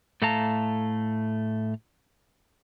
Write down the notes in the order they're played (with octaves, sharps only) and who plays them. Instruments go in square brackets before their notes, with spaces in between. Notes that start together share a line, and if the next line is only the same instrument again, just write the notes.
[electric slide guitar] A2 A3 A4 F5 A5 A#5